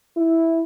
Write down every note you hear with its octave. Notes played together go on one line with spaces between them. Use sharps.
E4